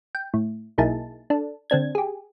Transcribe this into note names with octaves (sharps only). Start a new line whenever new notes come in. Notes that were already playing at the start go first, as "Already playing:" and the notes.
G5
A2
B1 A#3 D#4 E4 G#4 A5
D4 A4
D3 C4 D4 G#6
G4 G#4